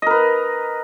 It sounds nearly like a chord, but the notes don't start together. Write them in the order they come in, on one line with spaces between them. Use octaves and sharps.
D#5 A#4 B4